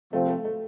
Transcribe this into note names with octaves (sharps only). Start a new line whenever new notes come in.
C3 F3 A3 C4 F4
A3
A3